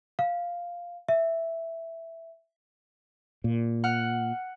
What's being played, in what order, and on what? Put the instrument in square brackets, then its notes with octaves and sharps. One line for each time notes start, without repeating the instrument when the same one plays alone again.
[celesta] F5
E5
[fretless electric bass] A#2
[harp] F#5 F6